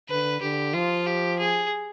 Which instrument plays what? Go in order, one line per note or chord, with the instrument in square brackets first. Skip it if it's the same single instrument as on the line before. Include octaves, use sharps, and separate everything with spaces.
[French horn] D3 [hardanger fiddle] B4
[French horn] D3 [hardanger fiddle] G4
[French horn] F3 [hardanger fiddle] F4
[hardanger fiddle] G4
G#4